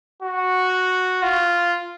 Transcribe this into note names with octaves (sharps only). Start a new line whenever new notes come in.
F#4
F4